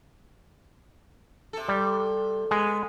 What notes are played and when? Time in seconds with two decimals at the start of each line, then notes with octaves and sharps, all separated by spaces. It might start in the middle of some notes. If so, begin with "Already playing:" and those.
1.53 C3 A4
1.69 G3
2.51 G#3 B3